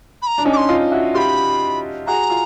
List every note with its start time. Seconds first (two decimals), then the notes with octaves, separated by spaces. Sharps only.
0.22 B5
0.27 A#5
0.38 D4
0.45 C#4 D#4
0.53 D6
0.57 C6
0.69 D#4 F4
0.91 E4 F#4
1.14 F4 G4 B5 C6
2.07 F#4 G#4 A#5
2.30 F4